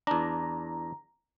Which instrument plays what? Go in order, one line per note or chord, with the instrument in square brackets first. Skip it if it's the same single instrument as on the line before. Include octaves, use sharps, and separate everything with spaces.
[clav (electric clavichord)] E2 D4 [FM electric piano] A#5